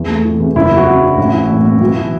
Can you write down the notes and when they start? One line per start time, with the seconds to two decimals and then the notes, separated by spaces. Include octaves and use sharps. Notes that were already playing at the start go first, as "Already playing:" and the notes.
Already playing: E2
0.08 A3
0.24 E3
0.40 E2
0.55 F#1 E4
0.71 F#3
0.77 F#4
0.87 F#2
1.03 D4
1.18 A1
1.33 E3
1.50 A2
1.65 B3
1.81 B1
1.97 E3